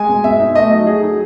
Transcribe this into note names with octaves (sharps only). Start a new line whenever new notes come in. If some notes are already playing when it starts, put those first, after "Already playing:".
Already playing: G#3 G#5
B2
B2 E5
D#4
A3 D#5
F#3
F#3 G#4
D#4